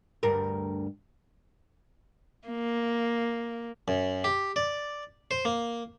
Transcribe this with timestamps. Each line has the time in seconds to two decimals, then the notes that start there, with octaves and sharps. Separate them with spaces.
0.23 D2 G2 A#4
2.48 A#3
3.88 F#2
4.24 G4
4.56 D5
5.31 C5
5.45 A#3